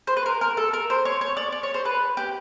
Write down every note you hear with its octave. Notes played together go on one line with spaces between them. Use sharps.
C5
B4
A#4
A#4
A4
A#4
C5
C#5
C#5
D5
D5
C#5
C5
B4
G4